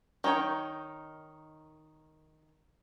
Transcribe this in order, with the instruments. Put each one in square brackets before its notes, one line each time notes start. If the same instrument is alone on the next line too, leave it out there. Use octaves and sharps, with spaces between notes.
[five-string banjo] D#3 D#4 C#5 G5